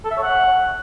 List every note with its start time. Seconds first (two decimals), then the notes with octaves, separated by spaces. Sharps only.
0.05 A4
0.11 E5
0.17 C#5
0.23 F#5